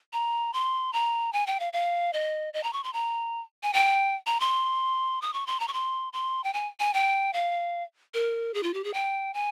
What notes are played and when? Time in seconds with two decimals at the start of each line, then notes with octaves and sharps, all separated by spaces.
0.13 A#5
0.53 C6
0.93 A#5
1.33 G#5
1.47 G5
1.60 F5
1.73 F5
2.13 D#5
2.54 D#5
2.63 A#5
2.73 C#6
2.84 C6
2.93 A#5
3.63 G#5
3.73 G5
4.26 A#5
4.40 C6
5.22 D#6
5.34 C#6
5.47 C6
5.60 A#5
5.68 C#6
5.73 C6
6.13 C6
6.44 G5
6.54 G#5
6.80 G#5
6.94 G5
7.33 F5
8.14 A#4
8.54 G#4
8.63 F4
8.74 G4
8.84 G#4
8.94 G5
9.34 G#5